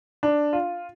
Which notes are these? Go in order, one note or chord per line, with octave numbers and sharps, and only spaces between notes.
D4
F4